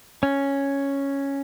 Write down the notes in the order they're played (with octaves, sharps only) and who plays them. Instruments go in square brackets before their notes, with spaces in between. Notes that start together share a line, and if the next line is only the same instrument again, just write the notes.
[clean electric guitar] C#4